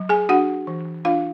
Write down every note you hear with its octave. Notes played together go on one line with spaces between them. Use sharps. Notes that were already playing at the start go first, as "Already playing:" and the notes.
Already playing: F#3
G#4 G#5
D4 F#4 F#5
E3
D4 F4 F5